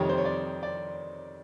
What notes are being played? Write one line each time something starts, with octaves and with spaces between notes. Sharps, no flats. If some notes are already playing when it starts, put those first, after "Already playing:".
Already playing: F2 C3 D#3 G3 C#5
C5
C#5
D5
D5